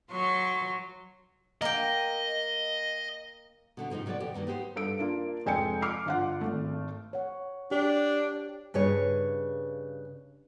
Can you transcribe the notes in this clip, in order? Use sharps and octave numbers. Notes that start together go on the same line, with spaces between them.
F#3 C6 C#6
A#3 D#5 G5
B2 D3 B3
G#2 C3 F3 C#4 D#4
C3 F#3 B3 A4 D5
D#2 B2 G4
G2 D#3 A3 A#3
B3 D#4 G4 C5
G2 A4 D7
A#3 D4 F4
F1 G#3 A4 G5 G#5 C#7
D6 F6 C7
G1 F4 F#5
G#1 A3
C#5 F#5
D4 G4
G2 C#3 G#4 C#5